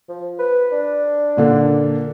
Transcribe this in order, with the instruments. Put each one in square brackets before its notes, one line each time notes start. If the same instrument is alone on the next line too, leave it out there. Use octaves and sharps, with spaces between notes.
[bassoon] F3
B4
D4
[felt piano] A#2 D3 A#3